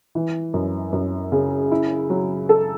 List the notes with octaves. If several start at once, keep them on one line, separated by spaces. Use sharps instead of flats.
E3
F#2
F#2
C#3
E4
F#3
A4